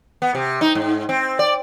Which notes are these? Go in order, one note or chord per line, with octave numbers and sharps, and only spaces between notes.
B3
C3
D#4
G#2
C4
D5